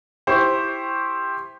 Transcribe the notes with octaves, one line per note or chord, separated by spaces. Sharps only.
E4 G4 C5 C#6